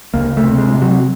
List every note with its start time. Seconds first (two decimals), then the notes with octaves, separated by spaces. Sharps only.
0.14 C#2 A#3
0.37 A3
0.44 C3
0.58 G#3
0.74 C3
0.82 F#3